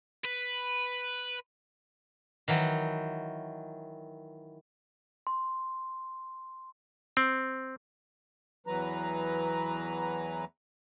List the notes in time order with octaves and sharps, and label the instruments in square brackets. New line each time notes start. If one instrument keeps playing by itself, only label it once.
[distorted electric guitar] B4
[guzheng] D#3 E3 F#3
[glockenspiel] C6
[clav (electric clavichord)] C4
[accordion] E2 E3 F#3 B4 A#5